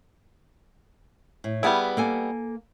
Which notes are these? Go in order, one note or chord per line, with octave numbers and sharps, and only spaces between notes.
A2
G3 B3 E4 G#4 B4
A#3 A4 G#5